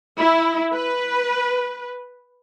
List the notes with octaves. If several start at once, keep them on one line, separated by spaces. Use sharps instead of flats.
E4
B4